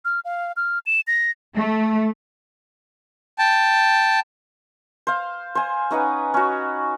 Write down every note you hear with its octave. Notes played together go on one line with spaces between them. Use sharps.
F6
F5
F6
E7
A#6
A3
G5 A5
C5 F5
C5 G#5
C#4 D#4 B4 F#5
C#4 F#4